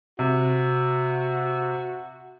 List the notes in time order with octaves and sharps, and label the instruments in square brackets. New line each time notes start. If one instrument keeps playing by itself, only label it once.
[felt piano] C3 [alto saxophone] F#4